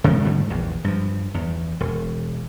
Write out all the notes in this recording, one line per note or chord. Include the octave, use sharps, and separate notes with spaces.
C3 G#3
G#2 D3 G3 A3
A#1 E2
G2 F3
E2
E1